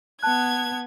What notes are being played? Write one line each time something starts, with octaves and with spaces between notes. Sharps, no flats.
B3 A5 F#6 G#6